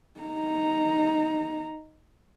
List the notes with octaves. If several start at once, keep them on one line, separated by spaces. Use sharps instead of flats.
D#4 A#5